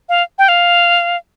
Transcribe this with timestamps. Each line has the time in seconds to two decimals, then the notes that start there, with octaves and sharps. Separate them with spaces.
0.09 F5
0.38 G5
0.48 F5